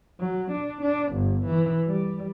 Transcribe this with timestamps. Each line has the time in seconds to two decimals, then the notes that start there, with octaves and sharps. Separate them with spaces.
0.20 F#3
0.52 D4
0.82 D4
1.13 G1
1.46 E3
1.87 G3